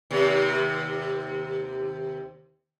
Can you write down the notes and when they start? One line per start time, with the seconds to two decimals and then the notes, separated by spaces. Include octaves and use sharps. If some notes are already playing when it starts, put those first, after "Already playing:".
0.11 D#2 C3